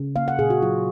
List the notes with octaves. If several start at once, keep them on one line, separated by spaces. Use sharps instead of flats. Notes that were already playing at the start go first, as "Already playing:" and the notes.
Already playing: C#3
A#3 F5
F#5
A#2 G#4
F#4
F#3 F4